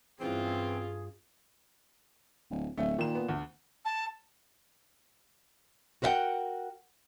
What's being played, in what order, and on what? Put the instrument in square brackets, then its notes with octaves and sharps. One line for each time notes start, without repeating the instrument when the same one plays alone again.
[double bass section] G2 [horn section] E3 C4 [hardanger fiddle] C#4 F4 [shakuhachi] G#4
[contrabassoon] D1
[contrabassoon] D1 [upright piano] A3
[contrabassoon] A#2 [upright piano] D#3 E7
[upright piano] B3
D2
[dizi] A5
[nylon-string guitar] F#4 A#4 B4 E5 F#5 G5